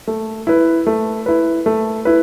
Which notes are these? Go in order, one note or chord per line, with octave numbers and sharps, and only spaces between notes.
A3
E4 B4
A3
E4 B4
A3
E4 B4